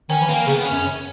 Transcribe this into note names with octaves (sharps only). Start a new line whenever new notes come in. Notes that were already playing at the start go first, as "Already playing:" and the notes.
D#3 C#4
E3
D#3 A#3
C#3 B3
B3
C#4
F#2